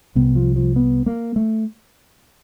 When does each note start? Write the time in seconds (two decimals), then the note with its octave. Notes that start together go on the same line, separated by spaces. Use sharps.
0.15 C2 C3 B3
0.36 F3
0.56 F3
0.76 B3
1.06 A#3
1.36 A3